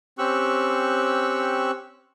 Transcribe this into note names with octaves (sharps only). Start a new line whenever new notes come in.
C4 C#4 G4 C#6 E6 F#6